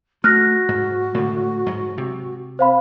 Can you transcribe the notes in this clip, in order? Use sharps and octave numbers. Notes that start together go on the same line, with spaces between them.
A3 F#4 F6 F#6 A#6
G#2
A2 D3
G#2 F#3
C3
C4 C5 F5 B5